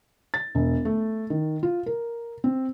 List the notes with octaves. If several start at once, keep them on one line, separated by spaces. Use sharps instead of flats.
A6
E1
A3
D#3
F4
A#4
C4